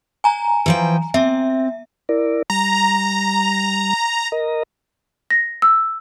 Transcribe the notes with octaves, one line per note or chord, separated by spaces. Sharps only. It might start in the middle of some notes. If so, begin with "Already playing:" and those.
G#5 A#5
E3 F3 G5
C4 E5
E4 A#4 D5
G3 A#5
A#4 D#5 A#5
A#6
E6